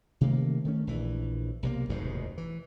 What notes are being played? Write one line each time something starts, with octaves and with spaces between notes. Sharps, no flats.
C3 D#3 A3 A#3
D#3 A3 C#4
A#1 E3
B1 C3 F3 A#3
F1 D#2 G#2 B2
E3